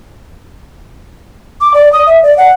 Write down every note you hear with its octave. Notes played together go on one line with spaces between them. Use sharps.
D6
D5
D#6
E5
D5
F#5